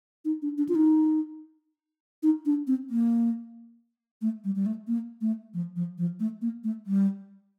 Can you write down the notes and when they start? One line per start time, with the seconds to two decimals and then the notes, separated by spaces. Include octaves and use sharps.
0.25 D#4
0.42 D4
0.58 D4
0.69 F4
0.75 D#4
2.23 D#4
2.46 D4
2.67 C4
2.90 A#3
4.22 A3
4.44 G3
4.56 G3
4.66 A3
4.88 A#3
5.21 A3
5.54 F3
5.76 F3
5.98 F3
6.20 A3
6.42 A#3
6.64 A3
6.86 G3